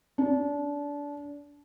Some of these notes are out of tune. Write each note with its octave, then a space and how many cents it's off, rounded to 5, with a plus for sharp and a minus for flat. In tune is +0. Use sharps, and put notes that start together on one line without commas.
D4 -25